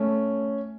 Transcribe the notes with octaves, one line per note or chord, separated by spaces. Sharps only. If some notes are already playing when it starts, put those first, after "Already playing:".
Already playing: A3 C#4